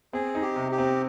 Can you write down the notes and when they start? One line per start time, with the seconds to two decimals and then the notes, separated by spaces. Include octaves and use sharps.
0.13 C4 G#4
0.35 D#4
0.42 G4
0.56 C3
0.72 G4
0.78 C4